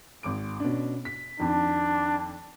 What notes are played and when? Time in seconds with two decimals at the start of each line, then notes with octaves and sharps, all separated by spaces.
0.23 G#1 D6 D7
0.60 B2 C#4 D4
1.05 B6
1.40 F2 D#3 D4